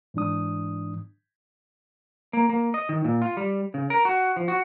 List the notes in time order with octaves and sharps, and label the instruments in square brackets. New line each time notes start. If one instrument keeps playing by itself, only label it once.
[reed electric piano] G#2 E3 D4 D#6
[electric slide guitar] A#3
A#3
D#5
D#3
A#2
F4
G3
C#3
A#4
F#4
F3
F#4